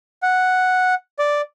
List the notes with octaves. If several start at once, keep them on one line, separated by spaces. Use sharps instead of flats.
F#5
D5